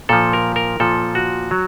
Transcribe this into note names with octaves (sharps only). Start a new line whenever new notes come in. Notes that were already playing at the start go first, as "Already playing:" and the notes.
A#2 F3 A4
A#4
A#4
A#2 F3 A4
F#4
F#3